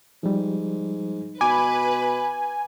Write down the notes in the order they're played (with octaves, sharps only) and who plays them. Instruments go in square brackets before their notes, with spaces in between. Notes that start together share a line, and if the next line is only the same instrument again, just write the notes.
[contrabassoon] G#2 [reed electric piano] F3 G3
[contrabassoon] B2 [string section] B4 [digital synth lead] G#5 [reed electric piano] D6